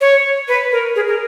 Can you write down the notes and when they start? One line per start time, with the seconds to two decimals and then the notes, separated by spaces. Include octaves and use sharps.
0.01 C#5
0.48 B4
0.72 A#4
0.96 G#4
1.08 A#4